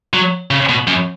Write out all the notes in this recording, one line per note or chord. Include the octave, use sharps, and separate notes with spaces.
F#3
C#3
B2
F#2